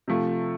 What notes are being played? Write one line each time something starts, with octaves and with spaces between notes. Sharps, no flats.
C3 F3 A3